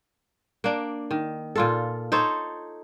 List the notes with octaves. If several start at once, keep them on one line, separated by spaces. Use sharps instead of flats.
A#3 D4
D#3
A#2 F4 A4
D#4 A4 C5 C#5